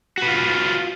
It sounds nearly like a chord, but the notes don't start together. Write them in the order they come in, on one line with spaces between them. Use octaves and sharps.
F#4 B4 F4